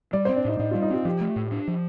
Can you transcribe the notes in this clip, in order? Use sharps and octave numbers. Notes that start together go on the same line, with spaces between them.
G3 D5
C4 C5
D4
A2 D#4
A2 D#4
G3 F4
D#4
C4 F4
F3 G4
A3
A2
D4
F3